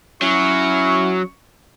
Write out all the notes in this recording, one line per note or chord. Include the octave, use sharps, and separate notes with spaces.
F#3 C#4 E4 C#6